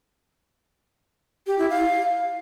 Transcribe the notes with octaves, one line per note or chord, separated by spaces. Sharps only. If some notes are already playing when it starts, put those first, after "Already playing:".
G4
E4
F5